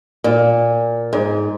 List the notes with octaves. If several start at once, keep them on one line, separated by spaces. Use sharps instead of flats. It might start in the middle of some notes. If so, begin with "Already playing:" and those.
A#2
G#2